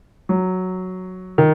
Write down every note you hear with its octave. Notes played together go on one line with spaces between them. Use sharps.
F#3
D#3